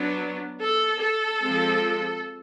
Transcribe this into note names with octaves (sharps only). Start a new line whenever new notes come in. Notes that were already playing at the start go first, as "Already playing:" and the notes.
Already playing: F#3 B3 D4
A4
A4
F3 G#3 C4